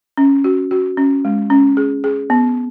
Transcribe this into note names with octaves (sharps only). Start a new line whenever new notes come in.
C#4
F#4
F#4
C#4
G#3
C#4
G#4
G#4
B3